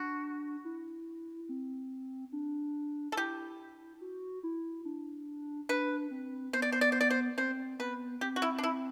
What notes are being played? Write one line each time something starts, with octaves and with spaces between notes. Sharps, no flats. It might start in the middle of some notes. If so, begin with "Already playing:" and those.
Already playing: D4 F#4
E4
C4
D4
A4
E4 G4
F#4
E4
D4
D4 B4
C4
B3 C5
D5
C5
D5
C5
D5
C5
C4 C5
B3 B4
C4 G4
F#4
E4
D4
E4